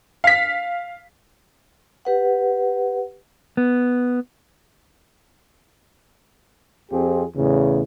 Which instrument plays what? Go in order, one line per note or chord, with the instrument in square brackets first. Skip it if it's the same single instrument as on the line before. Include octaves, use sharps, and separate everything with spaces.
[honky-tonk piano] F5 B6
[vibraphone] G4 B4 F#5
[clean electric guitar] B3
[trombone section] F2 C4 F4 G4 G#4
E2 A2 C#3